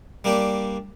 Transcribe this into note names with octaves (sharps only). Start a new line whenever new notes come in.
G3 A#3 D4 G4 D5